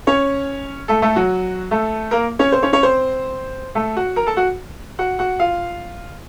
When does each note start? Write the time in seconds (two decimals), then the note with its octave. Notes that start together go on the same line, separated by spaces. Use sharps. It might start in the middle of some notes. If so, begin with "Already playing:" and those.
0.07 C#4 C#5
0.88 A3 A4
1.02 A3 A4
1.16 F#3 F#4
1.71 A3 A4
2.11 A#3 A#4
2.39 C#4 C#5
2.52 C4 C5
2.63 C#4 C#5
2.73 C#4 C#5
2.83 C4 C5
3.75 A3 A4
3.96 F#4 F#5
4.16 A#4 A#5
4.26 A4 A5
4.37 F#4 F#5
4.99 F#4 F#5
5.19 F#4 F#5
5.39 F4 F5